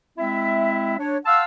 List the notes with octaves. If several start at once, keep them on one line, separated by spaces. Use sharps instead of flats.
G#3 C4 E4 E5
D4 C#5
F5 F#5 A5 C6 E6